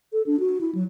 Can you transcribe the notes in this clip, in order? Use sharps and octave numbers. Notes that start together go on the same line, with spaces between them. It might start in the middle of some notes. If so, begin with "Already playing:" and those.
A4
D4
F#4
E4
F#3